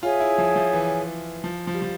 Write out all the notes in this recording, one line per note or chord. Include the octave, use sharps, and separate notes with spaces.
F4 G#4 C#5 E5 G#5
E4
F3
F3
E3
F3
F3
G3
F3